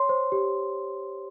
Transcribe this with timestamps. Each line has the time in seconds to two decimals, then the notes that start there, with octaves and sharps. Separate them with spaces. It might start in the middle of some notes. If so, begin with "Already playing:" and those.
Already playing: C#5 C6
0.09 C5
0.32 G4